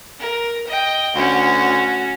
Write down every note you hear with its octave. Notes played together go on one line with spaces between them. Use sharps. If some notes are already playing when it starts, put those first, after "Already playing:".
A#4
D#5 G5
D2 C#4 F#4